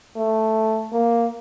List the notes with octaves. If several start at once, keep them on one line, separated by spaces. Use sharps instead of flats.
A3
A#3